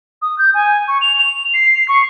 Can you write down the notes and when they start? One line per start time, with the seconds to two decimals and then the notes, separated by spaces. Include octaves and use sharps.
0.22 D#6
0.38 G6
0.54 G#5
0.88 C#6
1.01 F7
1.19 F7
1.54 C7
1.88 C#6